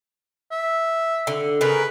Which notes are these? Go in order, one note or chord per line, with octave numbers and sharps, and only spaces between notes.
E5
D3
C#3 A#4 B4